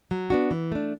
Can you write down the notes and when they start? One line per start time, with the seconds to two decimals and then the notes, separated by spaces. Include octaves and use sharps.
0.11 F#3
0.30 B3 D4 F#4
0.51 E3
0.72 A3 D4